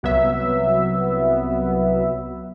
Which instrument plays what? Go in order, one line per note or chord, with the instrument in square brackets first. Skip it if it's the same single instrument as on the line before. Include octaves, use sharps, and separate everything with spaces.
[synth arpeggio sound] C2 F#3 B3 E5